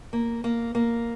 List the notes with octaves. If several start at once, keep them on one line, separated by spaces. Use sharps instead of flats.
A#3
A#3
A#3